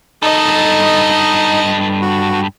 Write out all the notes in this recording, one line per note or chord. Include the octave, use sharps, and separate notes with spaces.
G2 D#4 A4 D#5
F#4